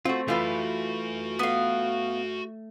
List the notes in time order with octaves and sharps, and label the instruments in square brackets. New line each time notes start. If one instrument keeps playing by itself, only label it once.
[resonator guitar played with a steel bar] A3 C4 [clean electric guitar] F4 F#4
[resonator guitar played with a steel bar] E3 F4 B4 [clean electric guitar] A3 [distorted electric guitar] F#4 G#5
[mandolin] B3 F5